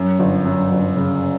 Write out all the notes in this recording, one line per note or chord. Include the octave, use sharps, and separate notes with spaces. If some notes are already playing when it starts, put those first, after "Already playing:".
Already playing: F#2
G1
F#2
G1
C#3